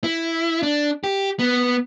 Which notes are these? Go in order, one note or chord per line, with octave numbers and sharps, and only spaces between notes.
E4
D4
G4
B3